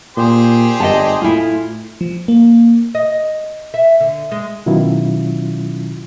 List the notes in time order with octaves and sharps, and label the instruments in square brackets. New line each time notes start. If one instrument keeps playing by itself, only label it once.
[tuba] A#2 [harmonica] G4 G#4 C5
[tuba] G1 [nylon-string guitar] D#5 F#5 A5
[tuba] A2 [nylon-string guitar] E4 F4
[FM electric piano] F3
A#3
[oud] D#5
E5
D3
G#3
[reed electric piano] B2 D#3 F#3 C#4 E4 F4